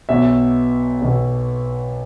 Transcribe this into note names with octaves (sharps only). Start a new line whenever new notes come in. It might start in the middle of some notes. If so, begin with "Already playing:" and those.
B1 B2 E5
B1 B2